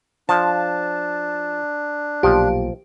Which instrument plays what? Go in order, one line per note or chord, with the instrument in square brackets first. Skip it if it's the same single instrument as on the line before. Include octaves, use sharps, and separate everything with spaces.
[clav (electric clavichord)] F3 [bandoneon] D4 [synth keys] A5
[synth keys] B1 A#2 [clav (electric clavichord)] F3 [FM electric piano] G4